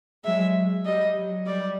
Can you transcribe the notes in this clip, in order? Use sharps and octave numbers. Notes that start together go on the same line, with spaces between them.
F#3 G#3 E5
G3 D#5
F#3
G3 D5